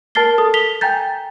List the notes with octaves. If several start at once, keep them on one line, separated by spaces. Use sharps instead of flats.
A#4 A5 F6 A6 C7 G7
A4 D#6
B6 F7 G7
G5 G#5 A#5 G6 A6